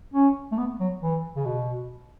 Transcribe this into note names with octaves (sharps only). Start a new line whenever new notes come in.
C#4
A3
B3
F#3
E3
C#3
B2